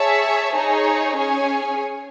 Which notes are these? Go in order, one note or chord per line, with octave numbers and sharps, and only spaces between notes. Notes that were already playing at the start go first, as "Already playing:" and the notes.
Already playing: G#4 C#5 E5 A5
D#4 G#4 C#5
C#4 G#4 C#5 G#5